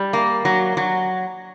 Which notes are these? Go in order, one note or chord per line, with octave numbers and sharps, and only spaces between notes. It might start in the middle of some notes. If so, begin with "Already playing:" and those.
Already playing: G3
A#3
F#3
F#3